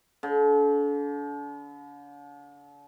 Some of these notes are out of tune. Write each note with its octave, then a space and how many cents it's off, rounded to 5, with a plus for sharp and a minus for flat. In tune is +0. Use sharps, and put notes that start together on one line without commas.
D3 -40